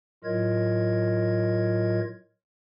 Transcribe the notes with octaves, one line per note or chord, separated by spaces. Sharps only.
A2 F#3 F4 A#4 D#5 G#6